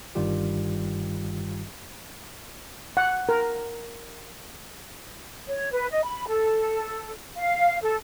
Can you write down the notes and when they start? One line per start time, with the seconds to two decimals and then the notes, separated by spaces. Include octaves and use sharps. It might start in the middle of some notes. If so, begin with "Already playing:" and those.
0.15 G1 G2 D#3 G3 F4 G4
2.97 F#5
3.29 A#4
5.48 C#5
5.71 B4
5.91 D#5
6.04 B5
6.28 A4
7.36 F5
7.82 A4